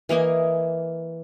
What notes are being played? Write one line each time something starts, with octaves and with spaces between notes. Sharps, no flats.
E3 A#3 D#5 G#5